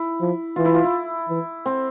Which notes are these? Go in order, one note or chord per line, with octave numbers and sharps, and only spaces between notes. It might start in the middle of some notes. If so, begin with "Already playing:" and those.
Already playing: E4
F3
E3 F4
E4
F4
E4
E3
C4